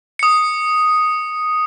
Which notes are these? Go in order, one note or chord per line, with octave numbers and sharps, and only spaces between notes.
D#6 C#7